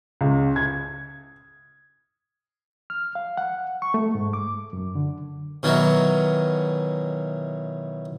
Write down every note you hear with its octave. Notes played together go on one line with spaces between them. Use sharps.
C#2
G#6
F6
F5
F#5
C#6
A3
G#2
D6
F#2
D3
B2 D#3 E3 F#3